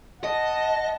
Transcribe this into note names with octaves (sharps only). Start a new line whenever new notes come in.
D#5 F#5 A5